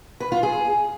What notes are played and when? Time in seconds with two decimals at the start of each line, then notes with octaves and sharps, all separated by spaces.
0.20 B4
0.32 F4
0.43 G#4